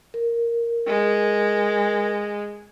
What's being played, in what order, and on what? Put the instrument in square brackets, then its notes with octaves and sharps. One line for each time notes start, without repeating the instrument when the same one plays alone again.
[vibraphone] A#4
[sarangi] G#3